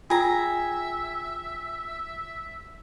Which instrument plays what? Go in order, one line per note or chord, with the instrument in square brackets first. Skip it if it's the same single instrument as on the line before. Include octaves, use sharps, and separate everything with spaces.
[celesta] F4 G5 [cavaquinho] G#4 A#5 [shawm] E5